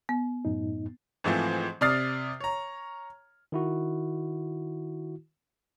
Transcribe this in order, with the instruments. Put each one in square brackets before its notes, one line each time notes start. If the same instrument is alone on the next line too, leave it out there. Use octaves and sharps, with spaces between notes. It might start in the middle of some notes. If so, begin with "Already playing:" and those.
[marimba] B3
[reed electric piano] F#2 A2 D#4
[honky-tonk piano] G#2 E3 F3 A3 C4
C3 D5 D#6 F6 A6 C7
C#5 A#5
[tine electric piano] D#3 E4 F#4